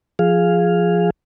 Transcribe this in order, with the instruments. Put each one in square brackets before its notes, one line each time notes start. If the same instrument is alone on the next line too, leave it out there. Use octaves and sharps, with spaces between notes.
[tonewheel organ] F3 G#4 F5